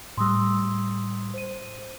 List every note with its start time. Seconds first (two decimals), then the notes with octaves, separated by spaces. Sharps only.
0.18 A2 G3 C6 D#6 E6
1.34 C5 D#7